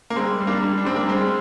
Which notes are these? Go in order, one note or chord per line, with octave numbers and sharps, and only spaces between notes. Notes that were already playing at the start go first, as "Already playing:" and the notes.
A#3
G3 G#3 C4
G3
A#3 D4
G3
D4
G3 C4
A#3 D4
G3 G#3 C4